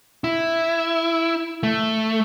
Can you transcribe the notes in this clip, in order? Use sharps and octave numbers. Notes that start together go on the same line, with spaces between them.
E4
A3